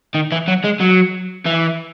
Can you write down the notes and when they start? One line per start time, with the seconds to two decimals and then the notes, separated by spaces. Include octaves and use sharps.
0.15 D#3
0.32 E3
0.48 F#3
0.64 G#3
0.80 F#3
1.45 E3